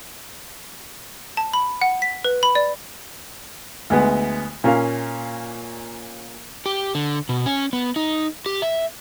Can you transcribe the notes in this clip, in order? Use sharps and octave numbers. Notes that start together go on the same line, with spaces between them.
A5
B5
F#5
B6
B4
B5
D5
D2 G#3 B3
A#2 C#4 A#4 F5
G4
D3
B2
C#4
B3
D#4
G4
E5